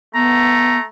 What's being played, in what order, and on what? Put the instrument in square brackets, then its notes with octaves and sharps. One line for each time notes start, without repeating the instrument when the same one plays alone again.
[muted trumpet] A3 [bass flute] B3 [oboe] A#5